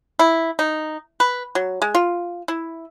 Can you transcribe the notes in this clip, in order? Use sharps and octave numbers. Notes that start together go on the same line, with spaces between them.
E4
D#4
B4
F#3
G#3
F4
E4